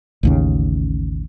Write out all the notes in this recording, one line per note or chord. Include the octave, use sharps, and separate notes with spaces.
A1 D#2 C#3